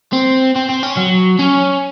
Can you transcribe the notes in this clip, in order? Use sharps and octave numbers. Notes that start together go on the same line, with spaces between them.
C4
C4
C4
C#4
F#3
C#4